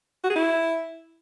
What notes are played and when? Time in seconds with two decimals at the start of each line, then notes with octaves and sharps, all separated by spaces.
0.24 F#4
0.30 G#4
0.36 E4